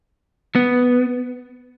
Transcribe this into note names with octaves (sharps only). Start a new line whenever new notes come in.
B3